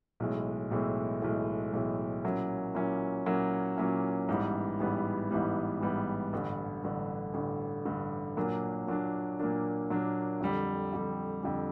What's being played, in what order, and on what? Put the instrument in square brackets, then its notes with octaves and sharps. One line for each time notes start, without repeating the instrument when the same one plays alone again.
[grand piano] B1 A2 E3 G#3
B1 A2 E3 G#3
B1 A2 E3 G#3
B1 A2 E3 G#3
A#2 F#3 A#3 C#4 E4
A#2 F#3 A#3 C#4 E4
A#2 F#3 A#3 C#4 E4
A#2 F#3 A#3 C#4 E4
A1 G#2 E3 G3 B3
A1 G#2 E3 G3 B3
A1 G#2 E3 G3 B3
A1 G#2 E3 G3 B3
A1 G2 D3
A1 G2 D3
A1 G2 D3
A1 G2 D3
A#2 F#3 A#3 D4
A#2 F#3 A#3 D4
A#2 F#3 A#3 D4
A#2 F#3 A#3 D4
F2 D3 G3
F2 D3 G3
F2 D3 G3